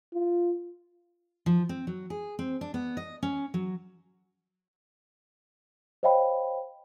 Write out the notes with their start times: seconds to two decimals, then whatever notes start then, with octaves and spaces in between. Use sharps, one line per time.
0.13 F4
1.46 F3
1.69 C4
1.87 F#3
2.10 G#4
2.39 C4
2.61 D4
2.74 B3
2.97 D#5
3.23 C#4
3.54 F#3
6.03 C5 C#5 D#5 F5 G5 B5